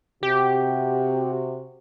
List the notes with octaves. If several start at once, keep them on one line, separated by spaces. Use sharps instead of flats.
C3 F#4 G4